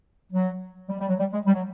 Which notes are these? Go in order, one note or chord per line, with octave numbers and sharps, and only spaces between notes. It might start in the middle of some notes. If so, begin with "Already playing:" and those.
F#3
G3
G3
F#3
G3
G#3
G3
F#3